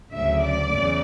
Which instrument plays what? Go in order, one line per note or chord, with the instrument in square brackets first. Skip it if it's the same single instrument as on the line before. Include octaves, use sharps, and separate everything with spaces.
[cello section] D2 C#3 F#3 E5
D5
E2 C#3